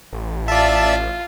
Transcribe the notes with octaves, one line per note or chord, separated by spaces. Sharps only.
A1
F4 D5 E5 A5